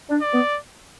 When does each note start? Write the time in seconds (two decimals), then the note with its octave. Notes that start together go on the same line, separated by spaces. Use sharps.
0.10 D4
0.21 D5
0.34 B3